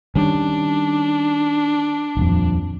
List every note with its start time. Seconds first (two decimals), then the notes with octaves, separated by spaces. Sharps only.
0.16 D#3 G3 C#4 D4
2.17 D#1 F2